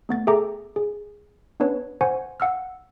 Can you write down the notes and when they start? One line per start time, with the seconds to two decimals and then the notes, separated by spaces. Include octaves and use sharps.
0.09 A3 B3 A6
0.27 G#4 A4 E5 G5 A#5 D6
0.76 G#4
1.60 B3 C#4 D4 B4 C#5
2.01 C5 F#5 G#5 C#6
2.40 F5 F#5 E6 F6